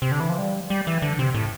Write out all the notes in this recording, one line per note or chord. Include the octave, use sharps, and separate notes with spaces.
C3
D3
E3
F3
G3
G3
E3
D3
C3
A2